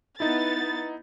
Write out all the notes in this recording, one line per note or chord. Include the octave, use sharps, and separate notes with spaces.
B3 D#4 E4 A6